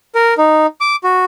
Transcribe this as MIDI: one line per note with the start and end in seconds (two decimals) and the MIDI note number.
0.15 0.34 70
0.38 0.66 63
0.81 0.96 86
1.04 1.25 66